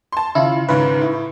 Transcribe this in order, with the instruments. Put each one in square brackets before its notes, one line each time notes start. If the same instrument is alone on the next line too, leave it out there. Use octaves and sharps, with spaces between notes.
[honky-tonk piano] A5 C6
[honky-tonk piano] C#3 [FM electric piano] E4 F4
[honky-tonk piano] G#2 C#3 [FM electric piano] B4
[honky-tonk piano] A2